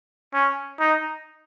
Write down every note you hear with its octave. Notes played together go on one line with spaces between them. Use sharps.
C#4
D#4